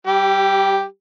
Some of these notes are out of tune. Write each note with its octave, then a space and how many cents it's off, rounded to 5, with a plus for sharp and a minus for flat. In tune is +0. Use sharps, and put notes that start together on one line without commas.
G3 -30 G4 +0